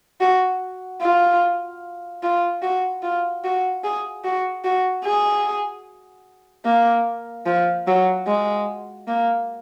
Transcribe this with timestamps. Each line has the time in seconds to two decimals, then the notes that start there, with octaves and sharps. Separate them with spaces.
0.21 F#4
1.01 F4
2.23 F4
2.62 F#4
3.03 F4
3.44 F#4
3.84 G#4
4.24 F#4
4.64 F#4
5.05 G#4
6.65 A#3
7.46 F3
7.87 F#3
8.27 G#3
9.08 A#3